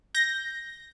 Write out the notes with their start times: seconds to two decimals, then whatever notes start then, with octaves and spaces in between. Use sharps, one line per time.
0.15 G6 A#6